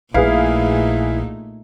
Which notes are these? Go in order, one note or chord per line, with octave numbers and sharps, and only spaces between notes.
A#1 A#2 A3 D#4 E4 G#4 B4 F5